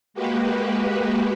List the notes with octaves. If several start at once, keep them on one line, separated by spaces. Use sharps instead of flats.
G#3 A#3 F#4 G4 B4